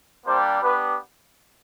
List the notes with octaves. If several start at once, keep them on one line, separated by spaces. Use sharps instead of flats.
G3 A#3 D4 G4 C5
B3 D4 G4 B4